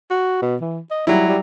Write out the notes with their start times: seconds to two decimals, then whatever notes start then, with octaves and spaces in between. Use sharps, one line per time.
0.10 F#4
0.42 B2
0.61 E3
0.91 D#5
1.07 F#3 G3 E4
1.28 G3